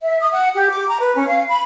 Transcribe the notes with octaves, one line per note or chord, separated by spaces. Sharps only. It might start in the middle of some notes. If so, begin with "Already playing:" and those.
E5
D#6
F#5
G4
D6
A#5
B4
C#4
F5
B5